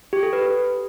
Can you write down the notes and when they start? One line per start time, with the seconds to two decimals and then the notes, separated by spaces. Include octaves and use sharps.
0.13 G4
0.23 A4
0.33 B4